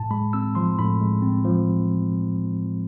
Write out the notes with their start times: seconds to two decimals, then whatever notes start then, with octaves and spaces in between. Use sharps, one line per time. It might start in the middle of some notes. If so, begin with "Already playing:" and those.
Already playing: A2 A5
0.11 G#3 B5
0.33 C4 E6
0.55 F3 C6
0.78 A2 B5
1.01 G#3
1.22 C4
1.44 F3